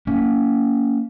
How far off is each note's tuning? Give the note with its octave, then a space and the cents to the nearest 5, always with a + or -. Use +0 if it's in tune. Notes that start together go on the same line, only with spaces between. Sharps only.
A#3 -10 C#4 +25